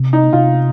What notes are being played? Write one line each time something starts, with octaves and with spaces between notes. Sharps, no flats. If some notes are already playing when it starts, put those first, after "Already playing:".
Already playing: C3
D#4
C3 F4